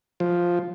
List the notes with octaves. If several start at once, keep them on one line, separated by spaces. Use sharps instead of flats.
F3